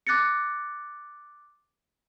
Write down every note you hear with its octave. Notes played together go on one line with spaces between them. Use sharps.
D6 F#6 A6 A#6 C#7